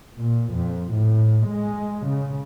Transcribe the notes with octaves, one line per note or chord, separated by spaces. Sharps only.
A#2
F2
A2
G#3
C#3